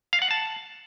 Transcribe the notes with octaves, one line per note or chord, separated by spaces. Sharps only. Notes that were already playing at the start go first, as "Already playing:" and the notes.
F5
F#5
A5